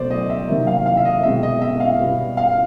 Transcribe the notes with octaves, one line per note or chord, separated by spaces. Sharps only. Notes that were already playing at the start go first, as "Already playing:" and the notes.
Already playing: B2 F#3 A3 C5 D5
D#5
E5
C3 D#3 F#3 A#3
F5
F5
E5
D#5
B2 G#3 C4 E5
D#5
E5
F5
B2 G3 B3
F5